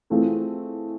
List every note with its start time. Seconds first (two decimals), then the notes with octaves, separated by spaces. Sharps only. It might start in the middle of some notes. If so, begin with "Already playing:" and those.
0.10 E3 A3 C4 F4 G#4